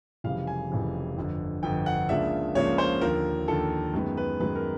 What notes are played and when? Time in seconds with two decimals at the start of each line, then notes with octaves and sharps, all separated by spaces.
0.24 F1 F2 C#3 E3 G3 F5
0.47 G#5
0.70 F1 F2 C#3 E3 G3
1.17 G1 F2 D3
1.63 G1 F2 D3 G5
1.86 F#5
2.09 C#2 C#3 F3 A#3 D4 E5
2.55 C#2 C#3 F3 A#3 D4 C#5
2.78 C5
3.01 D#2 D3 F3 A#4
3.48 D#2 D3 F3 A4
3.94 F#2 D#3 G#3 B3
4.17 B4
4.40 F#2 D#3 G#3 B3 B4
4.55 A#4